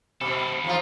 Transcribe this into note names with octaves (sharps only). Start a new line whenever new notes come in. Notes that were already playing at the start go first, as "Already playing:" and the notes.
D#2 B2 A4
E2 F3 F4